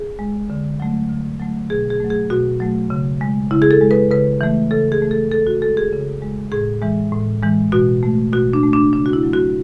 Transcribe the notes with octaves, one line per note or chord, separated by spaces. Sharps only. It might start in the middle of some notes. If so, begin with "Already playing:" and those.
Already playing: G#4
G#3
D3
F#3 A3
D3
F#3 A3
B2 G#4
G#4
F#3 A3
G#4
B2 F#4
F#3 A3
C#3
G#3
C#3 E4
G#4
A4
G#3
B4
C#3 B4
E3 A3
C#3 A4
G#4
E3 A3
A4
C#3 A4
F#4
G#3 A4
G#4
C#3
G#3
A2 G#4
E3 G#3
A2
E3 G#3
B2 F#4
A3
B2 F#4
D4
A3
D4
C#3 D4
F#4
E4
F#3 A3
F#4